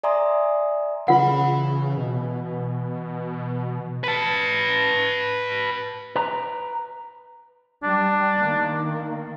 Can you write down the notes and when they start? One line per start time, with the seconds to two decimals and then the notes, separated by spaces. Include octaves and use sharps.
0.03 D5 E5 G#5 A#5 C6 D#6
1.08 C#3 E3 F4 F#5 B5
1.97 B2
4.04 B4 A5
6.16 B4 A#5
7.83 G3 D4
8.37 D#3 A#3